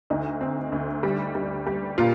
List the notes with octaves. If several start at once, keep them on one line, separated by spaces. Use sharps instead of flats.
D2 D#4
C4
D2
G3
G3
G3
A#2 F4